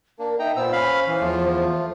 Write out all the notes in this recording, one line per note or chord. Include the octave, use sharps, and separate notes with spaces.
A#3 D4 A#4
D#4 E5 G5 A#5
A#2 B3 C5 E6
C#4 F5 B5
E3
E2 F3 A3 F4